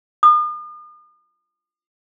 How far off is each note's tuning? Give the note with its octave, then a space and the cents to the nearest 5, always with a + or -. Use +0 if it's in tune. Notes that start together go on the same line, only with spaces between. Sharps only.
D#6 -40